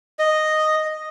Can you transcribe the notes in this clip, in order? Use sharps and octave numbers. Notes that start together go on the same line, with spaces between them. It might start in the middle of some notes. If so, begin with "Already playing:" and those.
D#5